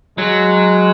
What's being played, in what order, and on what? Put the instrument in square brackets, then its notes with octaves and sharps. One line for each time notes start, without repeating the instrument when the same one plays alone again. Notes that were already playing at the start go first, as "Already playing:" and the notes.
[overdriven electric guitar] F#3 [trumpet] G#3